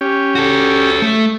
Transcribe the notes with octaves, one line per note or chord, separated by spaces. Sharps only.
C#4 G4
F#4 A4
A3